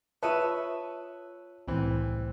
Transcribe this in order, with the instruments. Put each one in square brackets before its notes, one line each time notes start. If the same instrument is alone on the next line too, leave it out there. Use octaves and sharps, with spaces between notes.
[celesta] F4 A5 [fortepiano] B4 [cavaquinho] C#5 E5 D#6
[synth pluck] C2 A2 [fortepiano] E3 C4